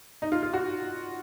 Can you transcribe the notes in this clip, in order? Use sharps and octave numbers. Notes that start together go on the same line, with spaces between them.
D#4
F4
F4
F#4